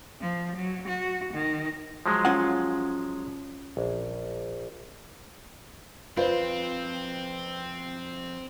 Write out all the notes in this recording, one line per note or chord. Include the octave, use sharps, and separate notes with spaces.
F3
F#3
F#4
D#3
F3 F#3 G#3
C#4 F4 F#5
A#1
F2 F3 C4 F4 B4 C5